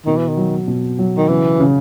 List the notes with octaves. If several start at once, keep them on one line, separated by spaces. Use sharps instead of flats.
B2 D#3
E3
D#3
F#3
B2
F#3
D#3
C#3 E3
C#3